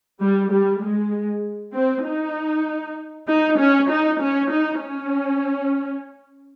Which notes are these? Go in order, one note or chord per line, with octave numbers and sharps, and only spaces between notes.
G3
G3
G#3
C4
D#4
D#4
C#4
D#4
C#4
D#4
C#4